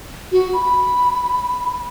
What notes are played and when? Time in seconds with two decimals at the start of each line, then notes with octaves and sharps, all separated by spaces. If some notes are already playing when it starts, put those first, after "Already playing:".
0.32 F#4
0.53 B5